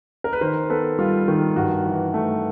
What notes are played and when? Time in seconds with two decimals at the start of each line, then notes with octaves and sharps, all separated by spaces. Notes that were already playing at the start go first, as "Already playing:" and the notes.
0.24 A#4
0.33 B4
0.41 D#3 A#4 C5
0.70 B3 A4 B4
0.99 G3 F4
1.28 D#3
1.56 G2 F#4
1.86 E3
2.14 A3